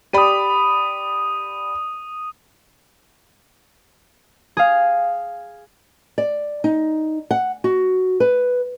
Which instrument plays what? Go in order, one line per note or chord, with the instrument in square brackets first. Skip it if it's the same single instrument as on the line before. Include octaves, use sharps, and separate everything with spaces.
[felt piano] G4 D5 B5 [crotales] D#6 D#7
[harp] G#4 F5
[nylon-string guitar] D5
D#4
F#5
F#4
B4